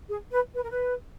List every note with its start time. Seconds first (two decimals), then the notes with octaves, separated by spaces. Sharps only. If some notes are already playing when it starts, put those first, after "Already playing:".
0.09 G#4
0.32 B4
0.55 B4
0.62 A#4
0.70 B4